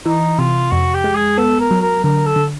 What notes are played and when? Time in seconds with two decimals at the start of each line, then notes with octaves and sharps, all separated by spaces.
0.06 E3 D#4
0.39 C3 F4
0.71 F2 F#4
0.94 G4
1.04 G#3
1.16 G#4
1.38 B3 A4
1.60 A#4
1.71 F#3
1.81 A#4
2.04 D3 A#4
2.26 A4
2.36 D3